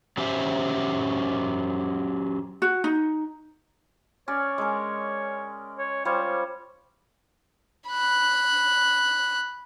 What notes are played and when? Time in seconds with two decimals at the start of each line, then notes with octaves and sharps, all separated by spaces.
0.17 F#3 C#4 G4 C5 E5
2.62 F#4
2.84 D#4
4.28 C#4 C#5 D5
4.58 G#3 A#4
5.78 C#5
6.05 G3 F4 C5 C#5
7.89 B5 F#6